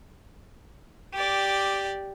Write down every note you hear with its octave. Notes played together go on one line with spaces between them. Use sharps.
G4 D5